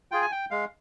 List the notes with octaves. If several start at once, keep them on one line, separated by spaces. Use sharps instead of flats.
F4 G#4 G5
G#5
G5
G#3 F5